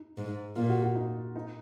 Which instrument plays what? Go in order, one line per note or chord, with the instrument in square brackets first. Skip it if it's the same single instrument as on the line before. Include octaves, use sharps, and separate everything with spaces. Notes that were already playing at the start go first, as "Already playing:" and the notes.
Already playing: [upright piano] D#4
[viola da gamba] G#2
[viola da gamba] A#2 [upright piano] F4
[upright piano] F#4
F#4
D#4
D#4